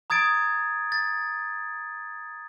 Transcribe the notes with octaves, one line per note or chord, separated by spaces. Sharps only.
A#5 D#6 G#6 A6 D7
A6